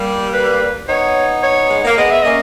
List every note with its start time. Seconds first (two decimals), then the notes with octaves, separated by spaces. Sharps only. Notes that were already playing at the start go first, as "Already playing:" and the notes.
Already playing: G3 A#3
0.34 B4
0.88 B3 D#4 C#5
1.43 C#5
1.71 G#3
1.85 A#3
1.97 G#3 B3 D#5
2.11 E5
2.23 A#3 C#4 D#5